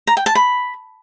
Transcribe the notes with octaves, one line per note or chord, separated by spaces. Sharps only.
A#5
G5
A5
B5